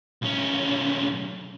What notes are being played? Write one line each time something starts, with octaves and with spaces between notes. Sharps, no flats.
B1 C#4